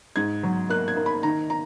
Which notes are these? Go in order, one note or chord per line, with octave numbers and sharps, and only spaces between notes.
G#2 G#6
F#3
A#3 F#6
G#6
A#3
B5
D#3 A#5
A#5